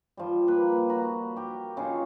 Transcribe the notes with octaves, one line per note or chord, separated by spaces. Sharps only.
F3 G3
A#3 B4
F#4 A#5 B5
G4 A#4
C#3 A#3 D#4 F4